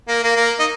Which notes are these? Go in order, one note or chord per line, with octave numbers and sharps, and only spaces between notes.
A#3
A#3
A#3
D#4